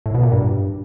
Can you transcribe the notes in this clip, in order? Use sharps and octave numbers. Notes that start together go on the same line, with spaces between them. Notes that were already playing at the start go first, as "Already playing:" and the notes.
A2
B2
A#2
G2